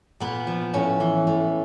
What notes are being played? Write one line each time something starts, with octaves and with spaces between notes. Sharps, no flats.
A#2 B3
F3
A2 C#4
E3
A2